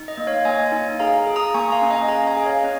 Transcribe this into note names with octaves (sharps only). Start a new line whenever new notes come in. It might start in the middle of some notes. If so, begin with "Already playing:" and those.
Already playing: D#4
D#5
A#3
C#5 F5
A#3 D#5 G#5
D#4
G#4 F5 A#5
G#4
A#5 D#6
A#3 G#5 C#6
F5 A#5
C#4
D#5 G#5
G#4 F5 A#5
D#5 G#5
G#4
C#5 F5
C#4 D#5